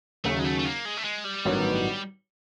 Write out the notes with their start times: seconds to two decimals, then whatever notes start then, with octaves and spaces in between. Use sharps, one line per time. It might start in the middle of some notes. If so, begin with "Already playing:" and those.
0.24 D#2 C#3 F#3 A3
0.39 G#3
0.44 A3
0.59 A3
0.65 A#3
0.86 G#3
0.98 A3
1.04 G#3
1.25 G3
1.45 A1 G2 D#3 F#3 B3